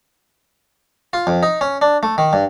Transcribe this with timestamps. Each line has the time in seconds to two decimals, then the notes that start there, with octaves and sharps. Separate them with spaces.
1.13 F4
1.27 F2
1.43 D#4
1.61 C#4
1.82 D4
2.03 A3
2.18 D#3
2.33 G2